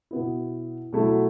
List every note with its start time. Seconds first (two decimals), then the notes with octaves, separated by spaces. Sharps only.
0.11 B2 B3 E4
0.93 B2 F#3 A3 E4